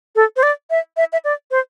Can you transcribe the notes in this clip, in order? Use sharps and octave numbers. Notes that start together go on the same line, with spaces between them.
A4
C5
D5
E5
E5
E5
D5
C5